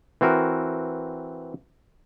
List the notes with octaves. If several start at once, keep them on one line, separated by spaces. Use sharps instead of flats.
E3 C4 F#4 A#4